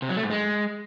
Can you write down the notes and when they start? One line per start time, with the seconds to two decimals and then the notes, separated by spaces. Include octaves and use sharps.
0.02 C3
0.09 F#3
0.16 A3
0.24 G#2
0.31 G#3